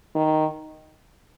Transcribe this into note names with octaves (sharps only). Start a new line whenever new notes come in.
D#3